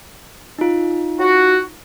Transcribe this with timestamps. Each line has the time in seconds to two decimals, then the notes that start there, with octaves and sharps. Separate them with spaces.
0.59 D#4 F4
1.19 F#4